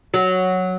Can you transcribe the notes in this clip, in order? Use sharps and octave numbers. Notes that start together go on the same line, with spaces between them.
F#3